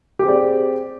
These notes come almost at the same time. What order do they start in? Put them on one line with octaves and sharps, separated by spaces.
G4 G#4 C4 D5